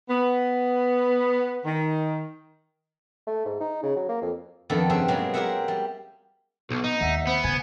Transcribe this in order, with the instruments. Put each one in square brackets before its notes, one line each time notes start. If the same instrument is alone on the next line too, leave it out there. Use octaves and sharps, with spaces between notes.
[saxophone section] B3
D#3
[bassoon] A3
G#2
D#4
C#3
F#3
A#3
F2
[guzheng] F2 D#3 B3 D4 A4
G2 C#3 C4 G#4 E5
B2 F#3 G#3 A#3 C4
G4 G#4 A#4 C5 E5 F#5
G3
[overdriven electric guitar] B1 [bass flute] B3
[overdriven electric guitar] D#4
[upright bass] D#2 [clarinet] E5 [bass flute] F#5
[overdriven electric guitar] B3 [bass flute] C5
[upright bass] C#3 [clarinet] G#5